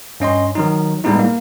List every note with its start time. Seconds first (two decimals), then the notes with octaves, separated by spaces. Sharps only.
0.20 G2 C#4 D#5 C6
0.55 D#3 F#3 D#4
1.04 A2 G3 G#3 B3 D#4 E4
1.19 A#3